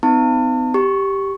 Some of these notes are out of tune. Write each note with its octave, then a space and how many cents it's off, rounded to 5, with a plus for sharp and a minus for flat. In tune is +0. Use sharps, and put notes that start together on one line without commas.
B3 +45 D#4 +0 A5 +40
G4 +0 C#6 +0